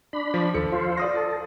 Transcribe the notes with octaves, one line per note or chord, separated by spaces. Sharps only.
D4 B5
F3
D#2 F3 A4 C#7
F4 C5
D5 D#6 A#6
A4